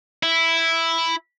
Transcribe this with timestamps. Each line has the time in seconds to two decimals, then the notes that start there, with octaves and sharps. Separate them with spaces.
0.23 E4